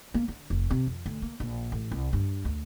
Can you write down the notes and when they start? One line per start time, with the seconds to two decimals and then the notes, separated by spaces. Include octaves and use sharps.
0.14 A#3
0.28 D3
0.50 F1
0.70 C3
0.87 F2
1.06 D2
1.22 A#3
1.40 A#1
1.72 A1
1.91 C2
2.13 G2
2.45 D2